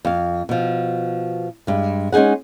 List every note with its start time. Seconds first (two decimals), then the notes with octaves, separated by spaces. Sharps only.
0.05 F2 F5
0.49 B2 F3
1.67 G2 G#3
2.12 G#3 C#4 D#4 G#4 F#5